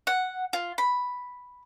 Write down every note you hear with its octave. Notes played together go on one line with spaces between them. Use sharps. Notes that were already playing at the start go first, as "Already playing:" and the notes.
F#5
F4
B5